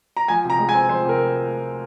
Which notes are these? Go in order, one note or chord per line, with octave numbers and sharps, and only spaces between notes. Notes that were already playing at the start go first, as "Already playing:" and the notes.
A#5
F3 G#5
C3
A#5
G#3
G#5
C4
F3 C5
C3 A#4